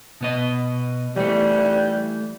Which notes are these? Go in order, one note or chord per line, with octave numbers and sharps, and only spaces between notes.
B2 B3 D#5
E3 G3 A3